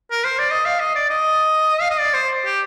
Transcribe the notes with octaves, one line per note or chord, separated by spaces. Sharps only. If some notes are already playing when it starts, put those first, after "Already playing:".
A#4
C5
D5
D#5
F5
D#5
D5
D#5
F5
D#5
D5
C5
G4